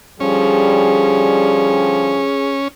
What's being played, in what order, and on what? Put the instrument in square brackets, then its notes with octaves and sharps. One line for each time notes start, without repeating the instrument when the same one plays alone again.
[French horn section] D3 F3 G3 [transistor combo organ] C#4 [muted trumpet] G#4